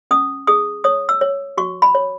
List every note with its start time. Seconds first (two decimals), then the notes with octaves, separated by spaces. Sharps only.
0.11 C#4 D#6
0.47 G#4 D#6
0.84 C#5 D#6
1.09 E6
1.21 C#5
1.57 F#4 C#6
1.82 B5
1.95 C#5